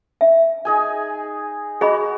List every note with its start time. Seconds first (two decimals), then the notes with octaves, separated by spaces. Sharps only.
0.21 E5
0.65 D#4 G#4 G#5
1.81 F#4 G#4 D#5 B5